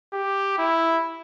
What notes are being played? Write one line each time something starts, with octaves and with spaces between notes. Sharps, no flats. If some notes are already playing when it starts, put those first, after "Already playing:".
G4
E4